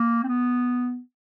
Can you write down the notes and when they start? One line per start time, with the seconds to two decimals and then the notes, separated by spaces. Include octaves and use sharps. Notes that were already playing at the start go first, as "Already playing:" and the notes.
Already playing: A#3
0.24 C4
0.28 B3